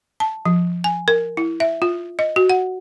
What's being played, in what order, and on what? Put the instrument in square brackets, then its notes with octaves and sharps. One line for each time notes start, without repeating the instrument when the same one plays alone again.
[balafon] A5
F3
G#5
A#4
E4
E5
F4
D#5
F#4
F#5